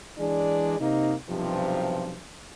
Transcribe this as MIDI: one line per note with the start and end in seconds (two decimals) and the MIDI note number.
0.18 0.77 52
0.18 0.77 56
0.18 0.77 62
0.18 0.77 68
0.18 0.77 74
0.79 1.14 48
0.79 1.14 58
0.79 1.14 63
1.29 2.15 35
1.29 2.15 43
1.29 2.15 48
1.29 2.15 53